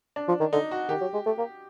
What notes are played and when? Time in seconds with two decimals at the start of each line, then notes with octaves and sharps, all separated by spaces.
0.16 D4
0.28 F3
0.40 D#3
0.53 D3 D#4
0.71 F#4
0.89 D#3 G4
1.01 F#3
1.13 G#3
1.26 A3
1.38 A#3